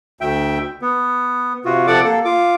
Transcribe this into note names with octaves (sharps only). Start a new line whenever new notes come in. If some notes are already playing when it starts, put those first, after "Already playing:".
D2 E5 G5
B3
C3 F4 F#4
C3 F3 A4 D5 F#5 D6
A#3 A4
F4 D6